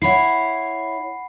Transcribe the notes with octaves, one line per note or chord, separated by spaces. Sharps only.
E4 C#5 F#5 B5 C7